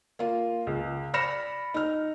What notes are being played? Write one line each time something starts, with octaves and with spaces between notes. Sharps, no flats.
A#3 F4
C#2
D5 B5 F6 A#6 C#7 E7
D#4 F6